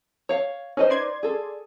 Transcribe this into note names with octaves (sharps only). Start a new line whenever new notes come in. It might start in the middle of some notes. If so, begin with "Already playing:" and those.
C#5 F5
C#4 D#4 B4 C5 D#5
D5 C6 G#6
G#4 A4